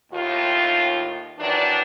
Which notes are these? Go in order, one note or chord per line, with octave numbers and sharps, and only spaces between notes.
D#2 A2 F4
D#3 E3 F#3 D4